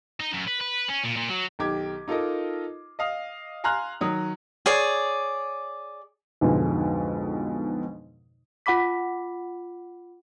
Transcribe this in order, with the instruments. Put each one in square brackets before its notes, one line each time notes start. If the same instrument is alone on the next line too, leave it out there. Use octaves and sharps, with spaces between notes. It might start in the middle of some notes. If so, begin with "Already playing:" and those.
[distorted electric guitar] D#4
F#2
B4
B4
C#4
A#2
A#2
F#3
[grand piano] B1 D#3 G4 D6 G#6
D#4 F4 A4 A#4 D#5
D#5 F5 D#6
F5 G#5 A#5 C6 F6 F#6
D#3 F#3 D#6
[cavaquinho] G#4 C#5 D5
[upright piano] B1 F2 G#2 B2 D3 G#3
[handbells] F4 F#5 B5 D6 B6